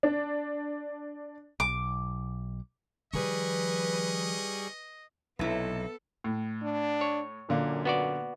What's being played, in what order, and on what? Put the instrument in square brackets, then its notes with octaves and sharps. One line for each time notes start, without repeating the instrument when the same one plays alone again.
[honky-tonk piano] D4
[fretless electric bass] B1 [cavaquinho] D6
[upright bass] D#3 F3 [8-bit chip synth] G3 G#4 C#6 [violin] B4 [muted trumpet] D#5
[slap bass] B1 C3 [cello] B3 A4 [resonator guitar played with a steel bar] E4 B4
[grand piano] A2
[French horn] D4
[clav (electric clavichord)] C#5
[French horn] F#2 [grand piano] A#2 D3 A#3
[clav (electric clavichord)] B3 F#4 D5